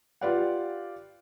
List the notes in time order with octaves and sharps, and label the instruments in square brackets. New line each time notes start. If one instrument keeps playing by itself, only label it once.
[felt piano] F4 G4 B4 D5 F5 F#5